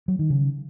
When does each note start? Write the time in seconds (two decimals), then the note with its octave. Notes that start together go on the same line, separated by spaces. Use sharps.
0.08 F#3
0.19 D#3
0.30 C#3